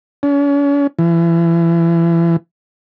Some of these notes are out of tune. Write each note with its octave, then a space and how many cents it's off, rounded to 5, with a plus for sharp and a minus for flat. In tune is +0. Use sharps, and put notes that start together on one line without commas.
C#4 +40
E3 +30